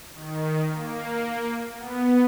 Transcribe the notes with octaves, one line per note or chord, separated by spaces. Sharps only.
D#3
A#3
B3